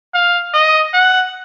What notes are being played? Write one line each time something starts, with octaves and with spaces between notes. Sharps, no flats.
F5
D#5
F#5